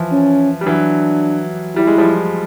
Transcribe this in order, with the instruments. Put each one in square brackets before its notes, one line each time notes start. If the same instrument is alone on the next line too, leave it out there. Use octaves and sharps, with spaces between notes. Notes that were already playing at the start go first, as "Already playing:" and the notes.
Already playing: [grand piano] E3 F3
[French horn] C#4
[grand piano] G3
[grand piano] E3 F#3 [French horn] D4
[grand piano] G3 [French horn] E4
[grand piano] G#3
F3 G3